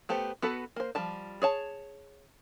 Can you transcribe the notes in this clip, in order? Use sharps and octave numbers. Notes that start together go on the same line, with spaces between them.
A3 B3 G4 C5
B3 F#4 A4 B4
A#3 C5
F3 G3 A5
G#4 C#5 A5